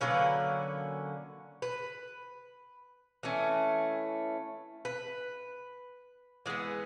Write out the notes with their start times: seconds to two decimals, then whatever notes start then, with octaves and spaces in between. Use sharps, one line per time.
0.01 D3 F#3 A#3 C#4 B4
1.62 B4
3.23 E3 A3 C#4
4.85 B4
6.46 E3 G#3 B3